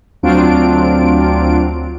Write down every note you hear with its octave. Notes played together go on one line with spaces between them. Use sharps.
D2 F#3 C4 D4 F4 D7